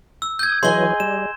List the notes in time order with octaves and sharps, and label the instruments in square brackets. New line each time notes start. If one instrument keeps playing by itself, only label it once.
[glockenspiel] E6
[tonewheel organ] D#6 [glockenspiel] G6 G#6
[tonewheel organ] E3 F#3 [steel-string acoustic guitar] G#4 D#5 G#5 [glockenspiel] C6 G7
[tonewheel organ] G3 [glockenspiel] E7